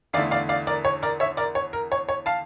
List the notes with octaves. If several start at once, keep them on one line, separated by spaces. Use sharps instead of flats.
E2 D3 A3 E4 D5 F5
D5 F5
D5 F5
A#4 D5
C#5
A#4 D5
C#5 E5
A#4 D5
C#5
A#4
C#5
C#5
F5 A5